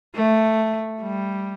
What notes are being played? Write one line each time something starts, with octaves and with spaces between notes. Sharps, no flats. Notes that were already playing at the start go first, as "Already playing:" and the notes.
A3
G3